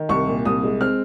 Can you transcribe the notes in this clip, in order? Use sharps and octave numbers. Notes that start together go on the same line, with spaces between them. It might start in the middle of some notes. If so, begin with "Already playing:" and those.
Already playing: D#3
C2 C#6
A#2
C2 D#6
G#3
C4 F6